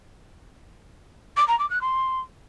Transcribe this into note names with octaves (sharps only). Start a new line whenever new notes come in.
D6
A#5
D6
F#6
C6